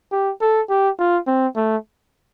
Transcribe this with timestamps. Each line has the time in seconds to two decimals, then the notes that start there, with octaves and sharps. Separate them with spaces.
0.12 G4
0.41 A4
0.69 G4
0.99 F4
1.27 C4
1.56 A3